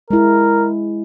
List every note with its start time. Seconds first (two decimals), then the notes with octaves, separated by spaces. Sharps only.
0.10 G#3 E4 A#4